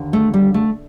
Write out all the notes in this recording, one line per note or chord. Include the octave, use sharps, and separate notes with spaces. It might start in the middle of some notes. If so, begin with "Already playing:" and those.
Already playing: D#2 D3
A3
G3
A3